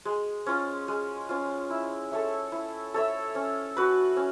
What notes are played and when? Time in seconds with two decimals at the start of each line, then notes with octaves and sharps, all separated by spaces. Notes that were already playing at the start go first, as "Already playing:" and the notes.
0.05 G#3
0.46 C#4 F4
0.88 G#3
1.29 C#4 F4
1.70 E4
2.11 A4 C#5 E5
2.52 E4
2.94 A4 C#5 E5
3.35 C#4
3.77 F#4 B4
4.17 C#4